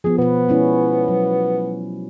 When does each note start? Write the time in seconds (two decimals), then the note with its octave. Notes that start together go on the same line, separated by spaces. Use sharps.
0.04 F3 B3 G#4
0.18 B2 B3 B4
0.49 G#3 C#4 E4
1.08 F#3